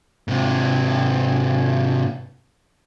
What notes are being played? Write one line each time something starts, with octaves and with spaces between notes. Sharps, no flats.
G#2 C3